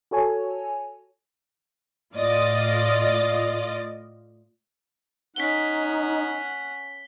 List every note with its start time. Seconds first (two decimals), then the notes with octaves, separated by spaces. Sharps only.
0.11 F#4 A4 C#5 G#5
2.15 A2 F4 D5 D#5 A6
5.36 C#4 D#4 F#5 B6 G7